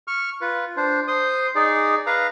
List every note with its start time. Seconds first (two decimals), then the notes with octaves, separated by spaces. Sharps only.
0.08 C#6 F6
0.41 F4 B4
0.77 D4 C5
1.08 C5 C6 D#6
1.55 D#4 G#4 D5
2.07 B4 F5 A#5